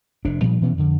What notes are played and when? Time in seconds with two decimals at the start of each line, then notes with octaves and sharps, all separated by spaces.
0.25 F1 C3 D4
0.41 A#2 F3 G3
0.62 B2 E3 B3 C#4
0.78 F2 D3